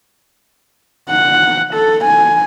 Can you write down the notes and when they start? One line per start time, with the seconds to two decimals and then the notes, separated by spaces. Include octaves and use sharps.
1.10 F#5
1.74 A4
2.05 G#5